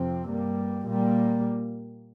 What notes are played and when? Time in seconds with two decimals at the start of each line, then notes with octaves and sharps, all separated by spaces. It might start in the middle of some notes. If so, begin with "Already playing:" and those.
Already playing: F2 C3 F3 C4
0.28 G2 G3 A#3
0.86 A#2 G3 A#3